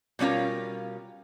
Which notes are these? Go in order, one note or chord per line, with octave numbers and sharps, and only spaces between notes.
B2 G3 C#4 F4 A#4